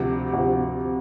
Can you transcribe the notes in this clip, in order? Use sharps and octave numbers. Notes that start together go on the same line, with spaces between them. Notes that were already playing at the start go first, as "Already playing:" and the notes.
Already playing: D2 C3 F3
D2 C3 F3